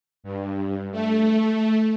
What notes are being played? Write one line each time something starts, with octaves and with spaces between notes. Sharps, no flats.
G2
A3